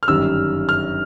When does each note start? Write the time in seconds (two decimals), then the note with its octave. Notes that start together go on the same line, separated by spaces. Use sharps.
0.03 F6
0.08 G1 F#2 D#3 G3 E6
0.69 F6